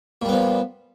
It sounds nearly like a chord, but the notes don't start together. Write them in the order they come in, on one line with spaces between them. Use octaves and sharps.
A#2 G3 B3 F3